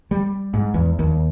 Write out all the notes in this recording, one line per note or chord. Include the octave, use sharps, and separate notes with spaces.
G3
G#2
E2
D#2